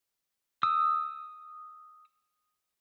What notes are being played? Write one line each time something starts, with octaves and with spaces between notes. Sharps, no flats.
D#6 E6